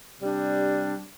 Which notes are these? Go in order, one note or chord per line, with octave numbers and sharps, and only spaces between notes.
C3 G3 D4